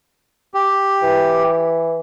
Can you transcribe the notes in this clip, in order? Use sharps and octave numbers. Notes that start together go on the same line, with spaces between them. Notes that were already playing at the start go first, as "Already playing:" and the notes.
G4
E3